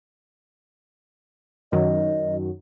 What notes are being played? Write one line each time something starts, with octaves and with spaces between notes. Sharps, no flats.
F#2 D#3 F#3 D#5